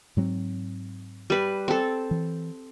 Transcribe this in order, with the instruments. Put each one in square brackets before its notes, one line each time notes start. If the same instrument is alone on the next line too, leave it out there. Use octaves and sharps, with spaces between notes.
[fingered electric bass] G#2 F#3 C4
[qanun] G3 B4
C4 A4
[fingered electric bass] E3